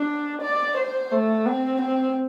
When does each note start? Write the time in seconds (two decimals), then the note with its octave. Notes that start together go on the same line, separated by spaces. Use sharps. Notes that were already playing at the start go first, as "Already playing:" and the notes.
Already playing: D4
0.42 D5
0.77 C5
1.12 A3
1.46 C4
1.81 C4